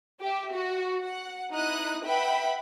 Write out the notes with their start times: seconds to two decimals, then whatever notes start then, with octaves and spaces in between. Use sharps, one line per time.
0.21 G4 E5
0.54 F#4
1.02 F#5
1.52 D#4 E4 D#6 F#6
2.05 B4 E5 F#5 G5 B5